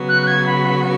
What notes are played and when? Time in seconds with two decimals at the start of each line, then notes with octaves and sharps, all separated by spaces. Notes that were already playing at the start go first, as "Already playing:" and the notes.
Already playing: C#3 F#3 B3 F#4
0.09 F#6
0.22 F#6
0.27 G#6
0.46 B5